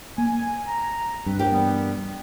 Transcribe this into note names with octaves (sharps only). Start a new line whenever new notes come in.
A#3 G#5
A#5
G2 C4 B4
F3 A#3 G4
E3 G3 B3